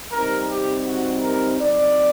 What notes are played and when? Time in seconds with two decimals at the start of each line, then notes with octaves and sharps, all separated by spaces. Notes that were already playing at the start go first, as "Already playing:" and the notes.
0.12 C3 G3 C4 D#4 A#4
0.49 G4
0.86 F#4
1.22 A#4
1.59 F#3 C4 D#4 D5